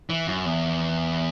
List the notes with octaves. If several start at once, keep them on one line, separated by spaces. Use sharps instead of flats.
E3
F#2
E2